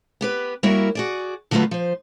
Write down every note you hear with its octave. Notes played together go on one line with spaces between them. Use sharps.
B3 G4 B4
G3 A#3 E4 F#4 A#4 C#5
F#4 G#4 D5
D3 F#3 A3 B3 F4 B4
F3 C5